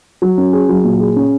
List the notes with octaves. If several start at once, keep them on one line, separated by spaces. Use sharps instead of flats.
F#3
C#4
G#4
F#3
A#2
G#4
C#4